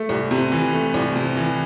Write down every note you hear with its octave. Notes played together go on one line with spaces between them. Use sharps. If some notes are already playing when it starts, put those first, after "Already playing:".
Already playing: A3
C2
C3
E3
A3
C2
C3
E3